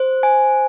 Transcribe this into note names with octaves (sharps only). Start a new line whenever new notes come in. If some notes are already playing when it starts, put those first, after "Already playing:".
Already playing: C5
G#5